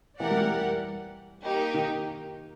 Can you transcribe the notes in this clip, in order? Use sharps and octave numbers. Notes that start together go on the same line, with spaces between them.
E3 G4 A#4 D5 F#5
G3
G3
A#3 D#4 G4
D#3